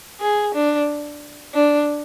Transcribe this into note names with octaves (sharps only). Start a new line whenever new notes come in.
G#4
D4
D4